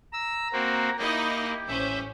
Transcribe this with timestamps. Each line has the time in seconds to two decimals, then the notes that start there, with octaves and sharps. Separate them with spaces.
0.13 A#5 E6
0.53 A#3 C4 F#4
0.99 A#3 D#4 E4 G4 D#5
1.68 A1 C#4 C5 E5